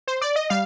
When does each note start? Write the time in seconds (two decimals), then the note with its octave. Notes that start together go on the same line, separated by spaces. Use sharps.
0.07 C5
0.21 D5
0.36 D#5
0.50 G3 F5